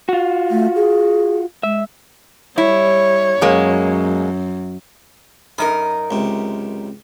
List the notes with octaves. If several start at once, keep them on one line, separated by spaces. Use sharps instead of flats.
F4 F#4
A3
G#4
G#3 E5
G3 E4 C#5
F#2 B2 G#3 A#3
F#2 D#4 A#4 B5
C#2 C3